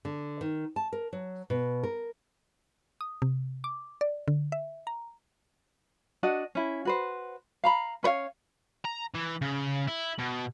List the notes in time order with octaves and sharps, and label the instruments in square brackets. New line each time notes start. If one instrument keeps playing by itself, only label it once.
[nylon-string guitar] D3
D#3
A5
A#4
F#3
B2
A#4
[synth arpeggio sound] D#6
C3
D6
D5
D3
E5
A#5
[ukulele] D4 F#4 D#5 F#5
C#4 E4
F#4 B4 C5
F5 A#5 B5
C#4 B4 C#5 F5
[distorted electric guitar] A#5
E3
C#3
E4
B2